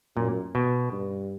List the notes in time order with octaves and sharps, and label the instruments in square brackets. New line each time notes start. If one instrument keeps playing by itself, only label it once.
[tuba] F#2 [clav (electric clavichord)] A#2
[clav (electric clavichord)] B2
[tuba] G2